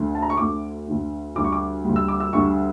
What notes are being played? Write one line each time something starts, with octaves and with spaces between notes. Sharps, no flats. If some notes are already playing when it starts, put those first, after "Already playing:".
Already playing: D2 D3 A3
A5
A#5
C#6
D2 D3 A3 D6
D2 D3 A3
D2 D3 G3 D6
C#6
D6
D2 D3 G3
E6
D6
E6
D2 D3 G3 C#6